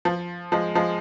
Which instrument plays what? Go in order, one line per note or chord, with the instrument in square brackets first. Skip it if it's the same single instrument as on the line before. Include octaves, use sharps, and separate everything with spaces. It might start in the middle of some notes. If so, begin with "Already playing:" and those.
[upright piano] F3
F3 G#3
F3 G#3